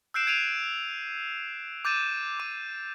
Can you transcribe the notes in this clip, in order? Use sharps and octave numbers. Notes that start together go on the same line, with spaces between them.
E6 F#6 G6 C7 D7 E7
G#6 D7 D#7 F7
D6 G6 A6 D#7 E7
D6 D#7